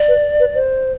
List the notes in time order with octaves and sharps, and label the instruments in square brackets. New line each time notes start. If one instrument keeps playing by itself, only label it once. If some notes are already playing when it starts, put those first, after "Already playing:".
Already playing: [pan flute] D5
[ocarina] B4
B4
C5